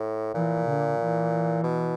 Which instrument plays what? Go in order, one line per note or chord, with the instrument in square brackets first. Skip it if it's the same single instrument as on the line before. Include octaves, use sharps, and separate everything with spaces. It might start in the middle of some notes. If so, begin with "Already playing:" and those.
Already playing: [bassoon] A2
[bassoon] A#2 [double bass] E3
[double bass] D3
E3
[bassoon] B2